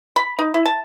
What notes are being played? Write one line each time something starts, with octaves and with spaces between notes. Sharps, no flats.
B5
D#4
E4
A5